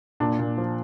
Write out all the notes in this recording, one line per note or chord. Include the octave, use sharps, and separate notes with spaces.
A#2 D4
A#2
F3